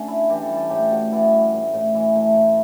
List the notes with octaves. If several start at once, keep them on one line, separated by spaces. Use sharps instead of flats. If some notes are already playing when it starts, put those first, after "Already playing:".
Already playing: D3 A3 C#4
E4
E3 G4
A4
G3
A4
A2 G4
A2 F#4
E3 E4
G3
A2
A2
E3 E4
A3
A2